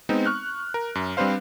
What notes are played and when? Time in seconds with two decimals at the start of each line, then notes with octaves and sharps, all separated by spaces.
0.09 G#3 B3 C4 D#4
0.26 C#6 F6 F#6
0.74 A#4
0.95 F#2
1.17 G3 C4 D4 B4 C5 F5